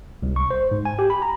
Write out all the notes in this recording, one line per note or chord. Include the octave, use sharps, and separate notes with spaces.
C2
C#6
C5
G#2
G#5
G4
B5
A#5